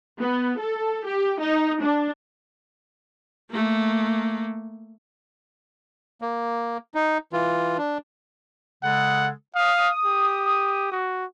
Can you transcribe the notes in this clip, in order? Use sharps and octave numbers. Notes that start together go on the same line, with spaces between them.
B3
A4
G4
D#4
D4
A3 A#3
A#3
D#4
E3 F4
D4
C#3 G#3 A4 F#5
F5 D#6
G4
F#4